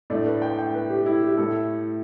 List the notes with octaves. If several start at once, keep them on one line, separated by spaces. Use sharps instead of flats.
A2 A3 D4 D5
B4
G5
G5
B4
G4
E4
G4
A2 A3 E4 A4